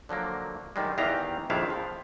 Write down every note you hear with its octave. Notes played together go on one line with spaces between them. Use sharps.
D3 F3 F#3 A#3
F#2 D#3 G3 G#3
E2 D#3 E3 G4 F5 A#5
A#1 F2 D#3 D4 E4 F5
F3